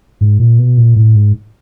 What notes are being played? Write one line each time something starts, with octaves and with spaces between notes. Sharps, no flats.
G#2
A#2
B2
A#2
A2
G#2